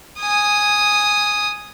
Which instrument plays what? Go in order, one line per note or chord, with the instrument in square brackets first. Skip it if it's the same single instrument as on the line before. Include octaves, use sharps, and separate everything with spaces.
[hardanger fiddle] G#5 D#6